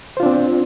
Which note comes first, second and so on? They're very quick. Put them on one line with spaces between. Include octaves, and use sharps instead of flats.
C5 F4 D4 C4